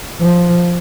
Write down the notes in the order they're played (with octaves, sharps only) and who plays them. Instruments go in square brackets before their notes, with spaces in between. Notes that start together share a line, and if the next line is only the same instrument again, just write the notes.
[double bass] F3